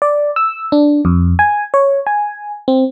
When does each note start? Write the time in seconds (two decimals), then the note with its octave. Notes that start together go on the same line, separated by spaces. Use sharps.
0.02 D5
0.36 E6
0.72 D4
1.05 F2
1.39 G#5
1.74 C#5
2.07 G#5
2.68 C4